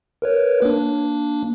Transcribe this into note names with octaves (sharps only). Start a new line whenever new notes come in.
A#4 B4 C#5
A#3 D4